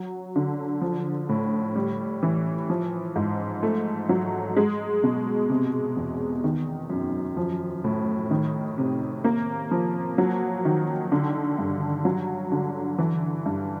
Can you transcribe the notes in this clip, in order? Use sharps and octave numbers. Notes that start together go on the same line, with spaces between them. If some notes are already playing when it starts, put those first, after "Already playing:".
Already playing: F#3
D3
F3
A2
G3
E3
F3
G#2
A3
F#3
G#3
B2
C3
E2
D#3
F#2
F3
A2
D#3
C3
A#3
F3
F#3
D#3
D3
G2
F#3
D3
E3
G2